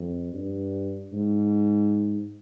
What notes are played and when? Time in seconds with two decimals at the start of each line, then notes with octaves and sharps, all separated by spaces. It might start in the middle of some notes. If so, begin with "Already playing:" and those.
Already playing: F2
0.33 G2
1.13 G#2